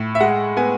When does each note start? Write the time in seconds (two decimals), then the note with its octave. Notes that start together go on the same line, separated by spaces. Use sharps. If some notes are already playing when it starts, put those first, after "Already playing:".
Already playing: A2
0.15 E5
0.20 G#3 F#5
0.57 B3 G#5